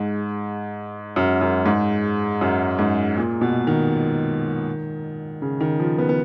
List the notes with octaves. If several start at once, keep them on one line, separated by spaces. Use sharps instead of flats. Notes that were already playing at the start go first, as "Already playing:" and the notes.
Already playing: G#2
F#2
F#2
G#2
F#2
G#2
A#2
B2
D#3
C#3
D#3
F3
B3
B3